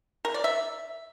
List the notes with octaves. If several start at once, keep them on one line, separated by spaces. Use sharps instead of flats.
A#4
D5
E5